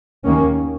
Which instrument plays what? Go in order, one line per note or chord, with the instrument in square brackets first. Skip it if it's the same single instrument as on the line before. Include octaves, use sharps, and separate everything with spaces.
[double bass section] D#2 D#3 A#3 C#4